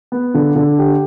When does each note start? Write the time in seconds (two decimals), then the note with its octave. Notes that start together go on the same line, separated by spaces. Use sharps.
0.12 B3
0.34 D3
0.56 D3
0.79 G4